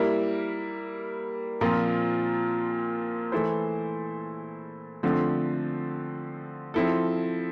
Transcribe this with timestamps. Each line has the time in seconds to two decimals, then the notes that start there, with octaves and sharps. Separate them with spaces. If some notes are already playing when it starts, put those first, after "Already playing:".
Already playing: G3 A#3 E4 A#4
1.61 A#2 F3 C4 F4 A#4
3.32 E3 A3 E4 A4 C5
5.03 D3 F3 A3 C4
6.74 F3 C4 E4 A4